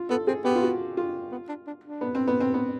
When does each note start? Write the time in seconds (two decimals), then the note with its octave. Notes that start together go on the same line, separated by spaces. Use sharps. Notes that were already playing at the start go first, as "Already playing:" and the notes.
Already playing: F4
0.09 B3 A4
0.27 C4 G#4
0.45 B3 G4
0.56 F4
0.62 F#4
0.97 F4
1.32 B3
1.49 D4
1.67 D4
1.84 D4
2.01 B3
2.15 C4
2.28 B3
2.40 C4
2.54 B3